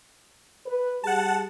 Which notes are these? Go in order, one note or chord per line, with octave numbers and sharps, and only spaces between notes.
B4
G3 G4 G#4 F#5 A5